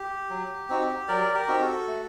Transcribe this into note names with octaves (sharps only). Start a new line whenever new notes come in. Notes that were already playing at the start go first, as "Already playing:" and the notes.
Already playing: G4
F#3
C4 D#4 F#4
F#3 A#4 D5
G4 A#4
C4 D#4 F#4
F#4 A4
A3